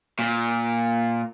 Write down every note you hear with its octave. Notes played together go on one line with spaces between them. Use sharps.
A#2